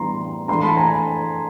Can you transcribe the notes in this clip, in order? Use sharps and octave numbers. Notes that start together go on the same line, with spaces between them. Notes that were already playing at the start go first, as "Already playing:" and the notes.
Already playing: A2 E3 G3 B3 D4 A#5 C6
E3 A3 D4 A#5 C6
A5 B5
G#5 A#5